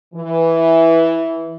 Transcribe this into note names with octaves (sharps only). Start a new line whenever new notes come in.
E3